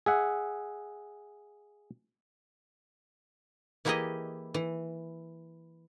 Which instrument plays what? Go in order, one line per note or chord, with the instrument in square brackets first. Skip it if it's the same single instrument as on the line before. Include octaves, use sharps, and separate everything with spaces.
[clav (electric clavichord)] G#4 E5 F#5
[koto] E3 A#3 E4 G4 G#4 D#5
E3